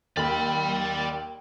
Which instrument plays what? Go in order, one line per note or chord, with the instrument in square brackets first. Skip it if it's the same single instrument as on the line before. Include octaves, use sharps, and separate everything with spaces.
[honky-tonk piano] D#2 [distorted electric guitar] D5 B5